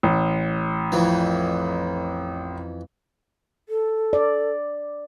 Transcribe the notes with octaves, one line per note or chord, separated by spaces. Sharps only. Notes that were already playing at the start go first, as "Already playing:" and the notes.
A1
F2 E3
A4
D5